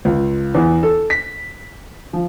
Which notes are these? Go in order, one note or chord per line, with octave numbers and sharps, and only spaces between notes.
C#2
E2
A4
B6
F3